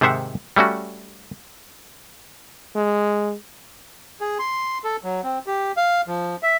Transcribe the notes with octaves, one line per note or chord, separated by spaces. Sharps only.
G#2 C3 D#3 C5 E5 F#5
G3 A3 C#4 F#4
G#3
G#4
C6
A4
F#3
C4
G4
F5
F3
E5